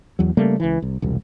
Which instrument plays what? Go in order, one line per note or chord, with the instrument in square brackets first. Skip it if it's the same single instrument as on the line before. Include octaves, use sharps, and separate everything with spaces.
[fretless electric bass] E2 F#3
C#3 G3 A3 A#3
C#2 E3
C2
E1 C2